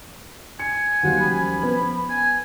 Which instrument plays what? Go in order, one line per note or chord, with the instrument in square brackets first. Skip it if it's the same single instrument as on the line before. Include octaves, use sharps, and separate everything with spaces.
[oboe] G#5 [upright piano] C#7
[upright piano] D#2 F#3 G3 [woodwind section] C5 F5 F#5
[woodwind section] F3 C#4 B5
[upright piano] B3
[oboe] G#5